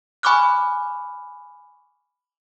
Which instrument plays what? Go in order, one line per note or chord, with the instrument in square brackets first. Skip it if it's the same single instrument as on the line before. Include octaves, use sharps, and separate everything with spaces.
[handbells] G#5 B5 C#6 D6 F6 F#6